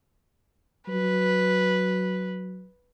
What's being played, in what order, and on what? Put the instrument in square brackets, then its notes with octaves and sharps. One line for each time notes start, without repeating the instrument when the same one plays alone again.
[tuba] F#3 [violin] B4